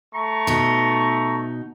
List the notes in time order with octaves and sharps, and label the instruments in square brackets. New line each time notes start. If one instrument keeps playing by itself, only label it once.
[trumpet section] A3 A#5 C#6
[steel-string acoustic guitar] B2 D#4